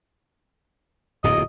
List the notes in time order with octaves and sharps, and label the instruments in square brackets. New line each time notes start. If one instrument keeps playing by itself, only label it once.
[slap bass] D1 F2 A#2 [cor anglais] D#5